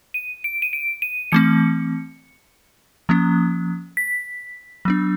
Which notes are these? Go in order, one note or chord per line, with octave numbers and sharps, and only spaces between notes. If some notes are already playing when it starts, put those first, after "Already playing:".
D#7
D7
D#7
D7
D#7
E3 A3 C4 C#7
F3 A#3 C#4
B6
F#3 B3 D4